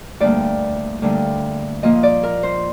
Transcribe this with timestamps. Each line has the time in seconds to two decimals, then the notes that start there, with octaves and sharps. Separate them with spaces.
0.20 D2 D3 G3 A#3 D5
1.02 D2 D3 G3 A#3
1.82 A#2 F3 A#3 D#5
2.03 D5
2.23 A#4
2.43 C5